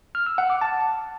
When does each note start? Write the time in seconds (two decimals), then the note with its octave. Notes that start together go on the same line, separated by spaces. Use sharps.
0.15 F6
0.26 E6
0.38 F#5
0.50 D6
0.61 A5